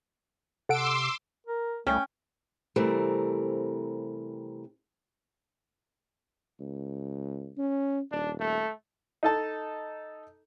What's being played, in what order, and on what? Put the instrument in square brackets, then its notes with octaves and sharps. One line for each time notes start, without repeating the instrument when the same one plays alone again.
[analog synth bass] C3 [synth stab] A4 F#5 D7 [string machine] C6 D6 E6
[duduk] A#4
[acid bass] C2 [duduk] A3 [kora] C#4 [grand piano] G5
[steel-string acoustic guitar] C3 E3 G3 A3 C4 A#4
[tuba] C#2
C#4
[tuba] D#1 [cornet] D4
[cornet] A3
[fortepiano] D#4 A4 A5